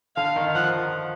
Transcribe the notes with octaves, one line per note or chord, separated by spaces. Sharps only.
D3 F5
D#3
D#3
F3 F#5